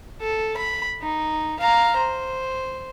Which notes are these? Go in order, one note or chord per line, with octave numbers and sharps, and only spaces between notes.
A4
B5
D#4
F5 A#5
C5